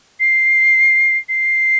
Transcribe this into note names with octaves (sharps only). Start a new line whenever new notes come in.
C7
C7